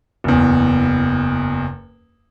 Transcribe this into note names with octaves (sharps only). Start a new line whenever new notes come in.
F#1 E2